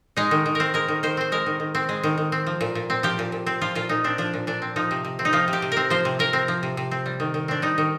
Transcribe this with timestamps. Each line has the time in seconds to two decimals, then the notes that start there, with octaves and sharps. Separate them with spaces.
0.17 G#3 D#4
0.31 D#3
0.46 D#3
0.55 C4 A#4
0.74 G#3 A#4
0.88 D#3
1.03 D#3 C5
1.17 C4 C5
1.32 G#3 A#4
1.46 D#3
1.60 D#3
1.75 C4
1.89 G#3 G#4
2.03 D#3
2.18 D#3
2.32 C4
2.47 F3
2.61 A#2
2.75 A#2
2.90 C4
3.03 F3 G4
3.19 A#2
3.32 A#2
3.47 C4
3.61 F3 F4
3.75 A#2 F4
3.89 A#2 D#4
4.04 C4 D4
4.18 F3 D4
4.34 A#2
4.47 A#2 D4
4.62 C4
4.76 F3 D#4
4.91 C3
5.05 C3
5.19 C4
5.25 D#4
5.33 F3 F4
5.48 C3
5.53 G4
5.62 C3
5.72 C4 A#4
5.90 F3 C5
6.05 C3
6.19 C3 A#4
6.33 C4
6.48 F3
6.63 C3
6.77 C3
6.91 C4
7.06 G3
7.20 D#3
7.34 D#3
7.48 C4 D4
7.62 G3 D#4
7.78 D#3